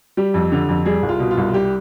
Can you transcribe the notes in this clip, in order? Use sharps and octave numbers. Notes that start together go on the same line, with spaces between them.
G3 G4
F2
D3
F2
G3 G#4
C2
F4
B2
F4
C2
G3 G4